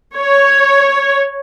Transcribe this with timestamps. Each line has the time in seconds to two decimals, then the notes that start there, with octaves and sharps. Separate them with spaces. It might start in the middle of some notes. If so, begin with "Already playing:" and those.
0.16 C#5